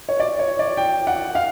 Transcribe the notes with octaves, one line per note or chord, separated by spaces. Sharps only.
C#5
D5
C#5
D5
G5
F#5
F5